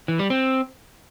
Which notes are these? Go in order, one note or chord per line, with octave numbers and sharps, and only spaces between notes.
E3
G3
C4